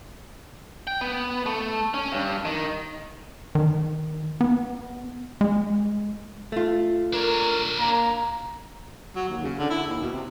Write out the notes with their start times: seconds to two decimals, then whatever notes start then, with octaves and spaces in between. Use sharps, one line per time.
0.87 G5
1.01 B3
1.46 A3
1.94 C#4
2.12 G2
2.45 D#3
3.55 D#3
4.41 B3
5.41 G#3
6.52 A3 F4
7.13 D4 A#4 C#5
7.79 A#3 A#5
9.16 F#3
9.29 D#2
9.43 C#3
9.59 D3
9.70 E4
9.87 D#2
10.00 B2
10.13 C3